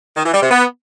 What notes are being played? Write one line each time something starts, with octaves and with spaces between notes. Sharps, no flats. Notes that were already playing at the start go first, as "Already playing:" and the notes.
D#3
E3
G3
C3
B3